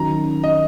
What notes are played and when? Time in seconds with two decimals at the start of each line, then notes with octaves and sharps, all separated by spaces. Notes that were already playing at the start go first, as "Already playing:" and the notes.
Already playing: D#3 F#3 C#4 A#5
0.44 D#5